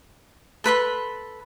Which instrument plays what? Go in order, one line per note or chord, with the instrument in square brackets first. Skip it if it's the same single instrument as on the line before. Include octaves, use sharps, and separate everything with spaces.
[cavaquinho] A4 B4 B5 C6